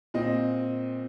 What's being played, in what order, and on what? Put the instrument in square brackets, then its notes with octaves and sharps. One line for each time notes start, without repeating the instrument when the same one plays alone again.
[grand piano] A#2 C4 D#5